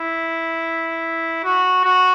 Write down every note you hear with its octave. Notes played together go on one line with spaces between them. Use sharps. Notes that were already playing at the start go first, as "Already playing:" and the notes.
Already playing: E4
F#4
F#4